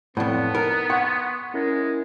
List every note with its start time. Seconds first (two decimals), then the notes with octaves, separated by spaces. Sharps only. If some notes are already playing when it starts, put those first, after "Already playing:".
0.17 F2 A2 B3 D5 F#5 A5
0.55 D#4 A#4
0.90 F#5 C6 C#6 G#6
1.54 G#3 C#4 E4 A#4